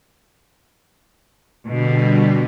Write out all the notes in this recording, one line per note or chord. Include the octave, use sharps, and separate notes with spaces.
B2 D3 G3